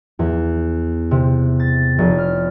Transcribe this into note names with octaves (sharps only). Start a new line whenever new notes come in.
E2
C3
A6
F1
F6